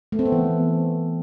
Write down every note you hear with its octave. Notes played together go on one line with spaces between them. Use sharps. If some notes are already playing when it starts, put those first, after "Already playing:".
A3
C4
B3
E3